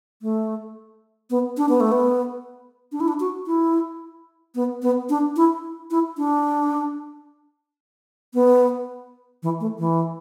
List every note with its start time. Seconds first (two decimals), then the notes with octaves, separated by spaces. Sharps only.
0.22 A3
1.30 B3
1.57 D4
1.69 B3
1.80 A3
1.92 B3
2.92 D4
3.00 E4
3.08 D4
3.20 F#4
3.46 E4
4.55 B3
4.82 B3
5.09 D4
5.36 E4
5.91 E4
6.17 D4
8.34 B3
9.43 E3
9.60 A3
9.79 E3